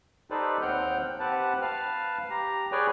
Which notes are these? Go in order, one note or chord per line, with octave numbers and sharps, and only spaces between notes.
D#4 G4 A4 B4 C5 D5
D#2 C4 F#5 G5 F6 G6
C4 G4 B4 F#5 A5
B4 F5 A5 F6
G4 A#5
G#4 B4 C#5 D5 G5 G#5